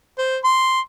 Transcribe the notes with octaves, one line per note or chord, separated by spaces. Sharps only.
C5
C6